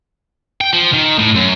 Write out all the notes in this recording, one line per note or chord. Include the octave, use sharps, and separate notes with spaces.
G5
F3
D#3
A2
F#2